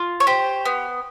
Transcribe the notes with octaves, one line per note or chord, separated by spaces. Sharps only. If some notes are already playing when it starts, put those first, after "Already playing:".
Already playing: F4
C#5
G4 C5
B3